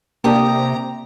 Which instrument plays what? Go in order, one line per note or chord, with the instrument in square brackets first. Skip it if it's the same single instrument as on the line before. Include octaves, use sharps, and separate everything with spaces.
[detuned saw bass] C3 [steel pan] A#3 D4 A5 [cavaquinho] G4 D#6 [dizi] A#5